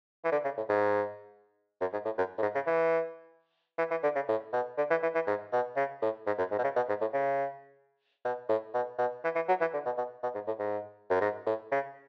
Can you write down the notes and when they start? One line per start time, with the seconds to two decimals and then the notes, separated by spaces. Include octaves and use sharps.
0.24 E3
0.32 D3
0.44 C#3
0.57 A2
0.69 G#2
1.81 F#2
1.93 G#2
2.05 A2
2.18 F#2
2.38 A2
2.42 G#2
2.55 C#3
2.67 E3
3.78 E3
3.90 E3
4.03 D3
4.15 C#3
4.28 A2
4.53 B2
4.77 D3
4.90 E3
5.02 E3
5.14 E3
5.27 G#2
5.52 B2
5.76 C#3
6.02 A2
6.27 G#2
6.38 F#2
6.51 G#2
6.59 B2
6.64 C#3
6.76 B2
6.89 G#2
7.01 A2
7.13 C#3
8.24 B2
8.49 A2
8.74 B2
8.98 B2
9.24 E3
9.35 E3
9.48 F#3
9.60 E3
9.73 D3
9.86 B2
9.97 B2
10.23 B2
10.34 G#2
10.47 A2
10.59 G#2
11.10 F#2
11.21 G#2
11.46 A2
11.72 C#3